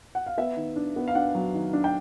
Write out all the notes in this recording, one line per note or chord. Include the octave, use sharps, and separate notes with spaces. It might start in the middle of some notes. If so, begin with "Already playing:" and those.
F#5
F5
B3 E5
D#3
D4
B3
F5
D4 F#5
F#3
D#3
D4
G5